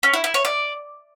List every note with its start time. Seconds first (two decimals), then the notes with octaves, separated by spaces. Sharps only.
0.03 C#4
0.14 E4
0.24 E4
0.34 C#5
0.45 D5